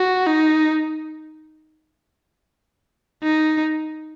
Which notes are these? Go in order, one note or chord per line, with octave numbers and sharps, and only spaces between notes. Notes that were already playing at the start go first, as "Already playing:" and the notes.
Already playing: F#4
D#4
D#4